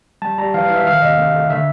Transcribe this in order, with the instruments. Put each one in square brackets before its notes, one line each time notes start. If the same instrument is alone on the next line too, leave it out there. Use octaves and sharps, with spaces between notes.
[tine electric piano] G3 A5
G3 A#5
E3 F5
F5
E3
E5
D#3 F5
C3 D#5
A3
A3
D3 E5